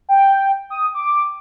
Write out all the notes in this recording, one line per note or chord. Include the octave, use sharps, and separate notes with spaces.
G5
D#6
D6